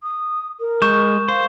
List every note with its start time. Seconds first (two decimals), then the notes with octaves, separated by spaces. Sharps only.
0.03 D#6
0.60 A#4
0.82 G#3 C#6 G6 E7
1.28 C5 F5